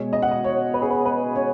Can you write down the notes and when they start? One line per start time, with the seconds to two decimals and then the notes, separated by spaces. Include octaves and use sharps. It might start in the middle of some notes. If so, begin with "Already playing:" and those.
Already playing: B2 G#3 C#5
0.13 D#5
0.22 F#5
0.31 D#5
0.44 C#5
0.74 B4
0.82 G#4
0.90 B4
1.06 B4
1.36 C#5